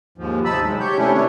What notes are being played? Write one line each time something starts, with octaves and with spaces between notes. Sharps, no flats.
D#2 G#2 F3
D2 C3 D#4 A5 B5 E6
G#2 F#3 G#3
G4 C#5 G6
C3 A3 C#4 D4 E4
D#3 D4 C#5